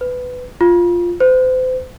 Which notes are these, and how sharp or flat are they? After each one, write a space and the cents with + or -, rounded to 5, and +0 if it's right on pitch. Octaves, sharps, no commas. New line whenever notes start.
B4 +15
F4 +0
C5 -35